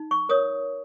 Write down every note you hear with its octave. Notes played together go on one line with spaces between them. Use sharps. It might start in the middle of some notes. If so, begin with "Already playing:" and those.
Already playing: D#4
C#6
A#4 C#5 D#6